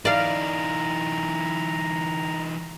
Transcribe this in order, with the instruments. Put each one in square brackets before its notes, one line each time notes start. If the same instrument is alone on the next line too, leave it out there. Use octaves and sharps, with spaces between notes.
[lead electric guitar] E3 D#4 [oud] D5 F5 [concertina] A#5